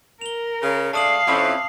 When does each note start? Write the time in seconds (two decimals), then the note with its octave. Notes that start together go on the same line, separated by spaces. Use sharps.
0.21 A#4 F7 G7
0.62 C#3
0.93 G#3 A3 D4 F5 A5 D#6 F#7
1.27 F2 C4 C#4 E4 D6